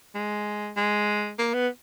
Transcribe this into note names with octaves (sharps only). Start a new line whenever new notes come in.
G#3
G#3
A#3
B3